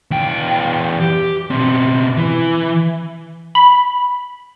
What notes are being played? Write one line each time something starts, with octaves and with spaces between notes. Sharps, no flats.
E2 G5
G4
B2 C4
E3
B5